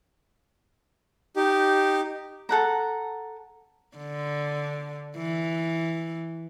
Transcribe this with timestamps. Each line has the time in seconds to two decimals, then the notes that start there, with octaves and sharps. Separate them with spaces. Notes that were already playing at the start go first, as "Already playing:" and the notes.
1.36 D#4 G4
2.49 A4 F#5 A#5
3.97 D3
5.17 E3